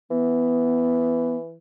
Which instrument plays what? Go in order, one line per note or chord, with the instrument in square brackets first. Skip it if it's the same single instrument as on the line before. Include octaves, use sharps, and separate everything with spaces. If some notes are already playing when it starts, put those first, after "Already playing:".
[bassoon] E3 [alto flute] B3